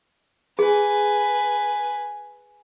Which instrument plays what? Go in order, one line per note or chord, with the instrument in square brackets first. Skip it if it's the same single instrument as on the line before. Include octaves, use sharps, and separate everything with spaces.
[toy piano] G#4 [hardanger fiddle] B4 G#5